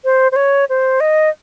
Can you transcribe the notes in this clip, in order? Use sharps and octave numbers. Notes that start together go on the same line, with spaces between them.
C5
C5
C#5
C5
D#5